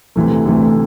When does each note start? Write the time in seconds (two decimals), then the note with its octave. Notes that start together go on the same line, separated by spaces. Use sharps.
0.16 D2 C3 E3 A3
0.45 D2 C3 E3 A3